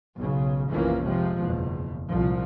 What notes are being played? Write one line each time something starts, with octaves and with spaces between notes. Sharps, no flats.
B1 C#3
F1 A#1 E3 F3 A#3 C#4
C3 F3 G#3
F#1 E2 B2
C2 A#2 F3